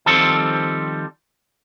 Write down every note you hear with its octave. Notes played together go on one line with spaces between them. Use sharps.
D#3 F3 G3 C4 A4